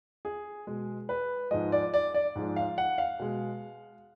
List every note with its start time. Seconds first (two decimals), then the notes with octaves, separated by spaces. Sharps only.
0.25 G#4
0.67 B2 G#3
1.09 B4
1.51 G#2 F3 G#3 D#5
1.72 D5
1.94 D5
2.14 D5
2.35 G#2 F3 G#3
2.56 F5
2.78 F#5
2.98 F5
3.19 B2 G#3